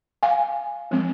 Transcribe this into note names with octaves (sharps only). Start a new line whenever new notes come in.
F5 G#5
F3 G#3 C4